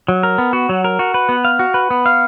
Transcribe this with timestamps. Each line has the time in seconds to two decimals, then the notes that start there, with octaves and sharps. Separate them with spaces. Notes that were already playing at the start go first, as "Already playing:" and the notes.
0.08 F#3
0.23 A#4
0.38 B3
0.53 F#4
0.69 F#3
0.84 A#4
0.99 F#4
1.14 B4
1.29 B3
1.45 F5
1.59 F#4
1.74 B4
1.91 B3
2.06 F5